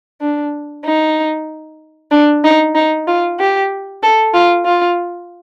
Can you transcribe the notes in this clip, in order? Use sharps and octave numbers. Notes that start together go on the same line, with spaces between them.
D4
D#4
D4
D#4
D#4
F4
G4
A4
F4
F4